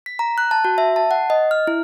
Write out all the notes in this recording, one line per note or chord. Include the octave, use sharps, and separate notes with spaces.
B6
A#5
F#6
A5
F#4
E5
A5
F#5
D#5
F6
E4